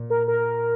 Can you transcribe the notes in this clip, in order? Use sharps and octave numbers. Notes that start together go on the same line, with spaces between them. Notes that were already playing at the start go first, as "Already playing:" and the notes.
Already playing: A#2
A#4
A#4